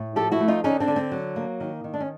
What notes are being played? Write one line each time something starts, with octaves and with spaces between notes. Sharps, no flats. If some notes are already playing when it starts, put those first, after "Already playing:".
Already playing: A2
F3 G4 A4
E4 F#4
A3
D#4 F4
D3 C#4 D#4
C4 D4
D3
C4
F#3
A#3
D#3
D#3
D4
C#4